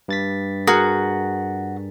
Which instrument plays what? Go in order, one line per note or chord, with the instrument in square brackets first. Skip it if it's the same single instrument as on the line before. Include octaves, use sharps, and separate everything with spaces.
[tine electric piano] G2 A6 B6
[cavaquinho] F#4 [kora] G#4 A#4 F#5